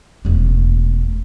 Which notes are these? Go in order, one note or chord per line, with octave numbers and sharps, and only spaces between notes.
E1 A3